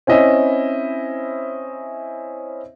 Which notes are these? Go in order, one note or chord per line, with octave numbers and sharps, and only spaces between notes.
C4 C#4 E4 D#5 E5